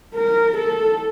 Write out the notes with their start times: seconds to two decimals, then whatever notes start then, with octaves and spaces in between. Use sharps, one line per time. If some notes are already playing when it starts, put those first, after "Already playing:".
0.15 A#4
0.57 A4